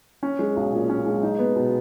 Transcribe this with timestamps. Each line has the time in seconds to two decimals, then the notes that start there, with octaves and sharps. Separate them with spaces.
0.23 C#4
0.39 G#3
0.57 B1
0.73 A#2
0.89 C#4
1.06 G#3
1.23 D#4
1.39 B3
1.56 B2